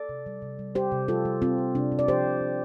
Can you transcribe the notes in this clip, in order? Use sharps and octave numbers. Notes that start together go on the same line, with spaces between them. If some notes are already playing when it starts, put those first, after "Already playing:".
Already playing: A4 D5
C3
G3
C3
G3
G3 G4 C5
C3
G3 F4 A4
G3
G3 C4 F4
G3
C3 D4
C3
D5
F3 G4 C5
C3
C3